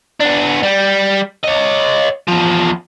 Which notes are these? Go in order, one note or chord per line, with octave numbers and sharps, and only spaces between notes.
B3 D4
G3
C#5 D#5
E2 F3